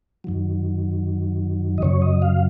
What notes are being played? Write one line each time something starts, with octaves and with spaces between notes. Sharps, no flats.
F#2 D#3 F#3
D#5
F#2 C#3 F#3 C#5
D#5
F5